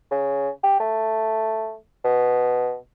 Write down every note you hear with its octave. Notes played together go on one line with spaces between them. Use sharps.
C#3
G4
A3
B2